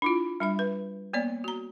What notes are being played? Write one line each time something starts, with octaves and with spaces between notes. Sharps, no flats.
D4 E4 F4
G3 D4 E5
B4
A#3 B3 C#5 D5
F#4 A#5